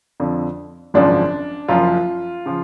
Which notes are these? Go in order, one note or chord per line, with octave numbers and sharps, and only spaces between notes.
F2 D3 F3
G#1 F#2 C#3 F3 D4
F#1 F#2 F3 F4
C#3 F3